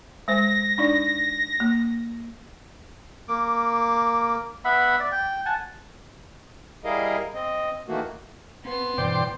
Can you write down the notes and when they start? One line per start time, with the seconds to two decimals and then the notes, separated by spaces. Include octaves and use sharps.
0.28 G#3 C5 A#6
0.78 D4 D#4 D5
1.60 A#3
3.28 A#3 D6
4.65 B3 E5 F#5 B5
5.00 D5
5.12 G5
5.46 F#5 G#5 A5
6.84 G3 E4 G#4 A#4 D#5 F5
7.34 C4 D#5
7.88 D#3 E3 A3 A#3 F#4
8.65 B3 C4 C6
8.98 G2 B2 E3 C5 D5 G5